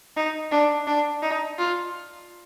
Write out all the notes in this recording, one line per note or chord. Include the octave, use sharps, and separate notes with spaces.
D#4
D4
D4
D#4
F4